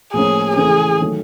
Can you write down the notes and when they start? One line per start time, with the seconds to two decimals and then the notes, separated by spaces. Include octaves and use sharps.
0.13 A2 F3 A#3 C#4 G#4
0.56 C#3 E3 A3 G#4
1.01 D#3 F#3 A3